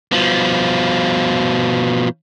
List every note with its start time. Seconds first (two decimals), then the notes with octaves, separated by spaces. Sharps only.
0.12 B2 F3